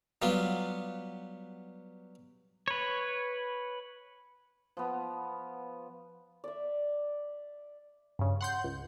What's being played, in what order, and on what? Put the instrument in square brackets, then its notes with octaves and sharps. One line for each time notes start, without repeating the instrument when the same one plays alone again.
[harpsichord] F#3 G3 B3 F4
[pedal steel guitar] B4 C#5
[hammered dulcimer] F3 B3
[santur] D5 E5
[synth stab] G2 C#3
F#5 C6 G6
C#2